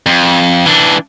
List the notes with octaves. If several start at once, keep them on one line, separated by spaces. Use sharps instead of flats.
F2
E3 D4